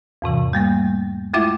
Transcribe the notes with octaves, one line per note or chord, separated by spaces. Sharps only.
E2 G#2 C3 E3
G3 A3 A#3
G#3 A3 E4 F4 E5